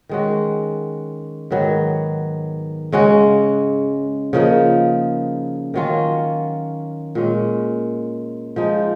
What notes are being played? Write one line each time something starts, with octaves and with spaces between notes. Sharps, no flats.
D#3 G#3 C#4 F#4
G#2 D#3 F#3 B3
C#3 G#3 C#4 F#4
C#3 F3 A#3 D#4
D#3 F#3 C#4 F4
A#2 G#3 C#4
F3 G#3 D#4